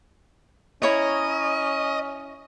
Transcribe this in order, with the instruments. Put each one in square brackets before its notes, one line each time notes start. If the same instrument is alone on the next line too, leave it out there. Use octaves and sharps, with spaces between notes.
[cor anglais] C#4 [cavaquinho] E4 C#5 A#5 [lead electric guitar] D#5